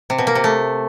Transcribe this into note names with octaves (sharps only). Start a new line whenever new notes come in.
C3
B2
A#3
C3
A3